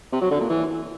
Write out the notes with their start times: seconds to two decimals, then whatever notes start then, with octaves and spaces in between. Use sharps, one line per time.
0.12 C3
0.22 F#3
0.31 D3
0.40 A#2
0.50 E3